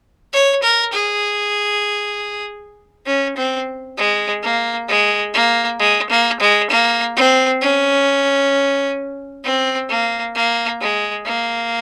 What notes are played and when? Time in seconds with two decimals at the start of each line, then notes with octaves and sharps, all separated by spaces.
0.33 C#5
0.63 A#4
0.93 G#4
3.06 C#4
3.37 C4
3.98 G#3
4.43 A#3
4.89 G#3
5.34 A#3
5.80 G#3
6.10 A#3
6.40 G#3
6.71 A#3
7.16 C4
7.62 C#4
9.44 C4
9.89 A#3
10.35 A#3
10.81 G#3
11.26 A#3